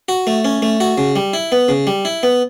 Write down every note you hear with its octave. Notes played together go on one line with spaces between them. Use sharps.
F#4
A3
C#4
A3
F#4
C#3
G3
E4
B3
C#3
G3
E4
B3